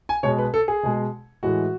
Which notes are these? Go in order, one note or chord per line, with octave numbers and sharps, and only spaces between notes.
G#5
B2 G#3 C#5
B4
A4
G#4
B2 G#3
A2 E3 G#3 F#4